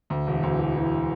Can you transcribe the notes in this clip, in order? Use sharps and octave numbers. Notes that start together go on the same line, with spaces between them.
D2
E1
D2
E3
E3